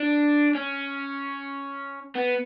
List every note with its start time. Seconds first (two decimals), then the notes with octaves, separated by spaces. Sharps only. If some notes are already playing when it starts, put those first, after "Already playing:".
Already playing: D4
0.55 C#4
2.15 B3